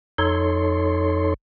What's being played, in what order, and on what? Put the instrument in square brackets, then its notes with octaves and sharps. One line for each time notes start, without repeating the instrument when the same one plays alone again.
[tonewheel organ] F2 D#4 A4 C#5 C6